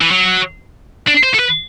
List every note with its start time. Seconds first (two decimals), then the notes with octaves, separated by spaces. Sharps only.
0.01 E3
0.11 F#3
1.08 D4
1.24 C5
1.34 A4
1.39 B4